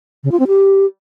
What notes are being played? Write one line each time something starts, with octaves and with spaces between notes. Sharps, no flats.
C#3
F4
C4
G4